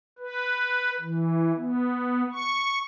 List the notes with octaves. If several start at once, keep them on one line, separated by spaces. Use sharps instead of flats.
B4
E3
B3
C#6